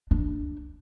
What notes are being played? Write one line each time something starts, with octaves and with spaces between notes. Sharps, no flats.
D4